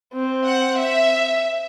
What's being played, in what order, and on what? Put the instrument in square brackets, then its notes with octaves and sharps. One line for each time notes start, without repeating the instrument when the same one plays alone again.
[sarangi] C4
[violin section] F#5
E5